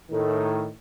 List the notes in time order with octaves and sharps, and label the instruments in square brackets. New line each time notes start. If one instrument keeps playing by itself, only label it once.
[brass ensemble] A2 D#3